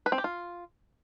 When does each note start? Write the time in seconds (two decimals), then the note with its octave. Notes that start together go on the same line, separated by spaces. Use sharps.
0.06 B4
0.12 C4
0.18 G4
0.24 F4